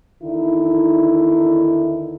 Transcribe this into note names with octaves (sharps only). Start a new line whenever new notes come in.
E2 D3 D#3 D#4 E4